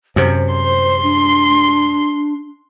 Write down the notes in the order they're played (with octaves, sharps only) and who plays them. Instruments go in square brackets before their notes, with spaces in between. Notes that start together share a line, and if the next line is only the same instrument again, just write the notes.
[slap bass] F#2 C3 [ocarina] C5
[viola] C6
[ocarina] D4